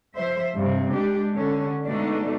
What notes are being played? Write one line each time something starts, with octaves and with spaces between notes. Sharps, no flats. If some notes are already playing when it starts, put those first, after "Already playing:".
F3 C5 E5
G2 C3
G#3 D4 G4
D3 C#4
B2 G#3 A3 D4 D#4